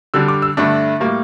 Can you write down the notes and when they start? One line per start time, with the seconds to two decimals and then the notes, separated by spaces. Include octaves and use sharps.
0.14 D3 G3 D4 E6
0.28 D6
0.42 E6
0.57 G2 D3 A3 D4
1.00 A2 G3 A#3